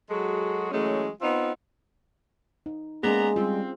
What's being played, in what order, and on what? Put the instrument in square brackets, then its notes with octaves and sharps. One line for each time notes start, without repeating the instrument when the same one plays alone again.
[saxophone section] F#3 G#3 F#4 G#4 A4
E3 F#3 G#3 A3 C#4
B3 C4 D#4 F4
[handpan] D#4
[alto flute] G#3 [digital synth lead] A#3 [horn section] B3 D5 A#5 [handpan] C#4 G#4
[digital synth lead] G3 [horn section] C4 [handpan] F4